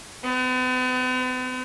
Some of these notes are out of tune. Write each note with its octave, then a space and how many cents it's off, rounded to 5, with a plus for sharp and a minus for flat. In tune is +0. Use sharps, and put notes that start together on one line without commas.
B3 +45